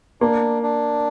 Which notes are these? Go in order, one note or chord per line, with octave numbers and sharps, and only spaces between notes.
A#3 D4
D4